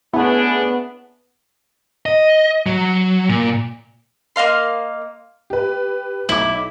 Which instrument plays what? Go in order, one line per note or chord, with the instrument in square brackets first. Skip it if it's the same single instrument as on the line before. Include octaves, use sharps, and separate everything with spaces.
[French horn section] A3 C#4 D4 [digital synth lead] B3 [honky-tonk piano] E4 G#4
[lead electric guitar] D#5
F#3
A#2
[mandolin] A#3 D#5 F5 C6
[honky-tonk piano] G4 B4
[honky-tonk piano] B1 D6 [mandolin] E4